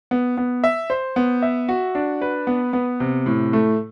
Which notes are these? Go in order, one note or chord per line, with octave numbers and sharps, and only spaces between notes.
B3
B3
E5
C5
B3
E5
F#4
D4
B4
B3
B3
C3
A2
A3